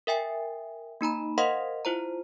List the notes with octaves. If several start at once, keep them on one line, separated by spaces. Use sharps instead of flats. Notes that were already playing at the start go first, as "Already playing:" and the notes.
A#4 E5 G5 G#5
A#3 D#4 A#5 B5
A#4 C5 D#5 F5 F#5 C6
E4 F4 C5 A#5